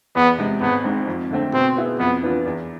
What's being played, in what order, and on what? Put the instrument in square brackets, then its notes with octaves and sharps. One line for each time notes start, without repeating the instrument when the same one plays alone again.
[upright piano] E2 [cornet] B3
[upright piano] C3 G#3
[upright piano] G#1 [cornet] B3
[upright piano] G#2 G#3 C4
F2
D3 A3 C4
[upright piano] B2 [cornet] C4
[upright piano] B3 E4 G#4
[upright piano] F2 [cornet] B3
[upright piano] E3 B3 D4 F4
E2